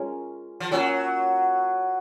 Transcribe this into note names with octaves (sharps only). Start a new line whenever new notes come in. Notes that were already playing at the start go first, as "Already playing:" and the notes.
Already playing: G#3 C#4 F4 A#4
F3
F#3 A#3 C#4 F4